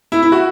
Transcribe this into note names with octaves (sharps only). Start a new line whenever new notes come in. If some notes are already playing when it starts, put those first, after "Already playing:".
E4
E4
F#4